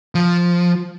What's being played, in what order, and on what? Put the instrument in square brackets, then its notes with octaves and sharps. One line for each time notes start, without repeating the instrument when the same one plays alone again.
[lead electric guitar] F3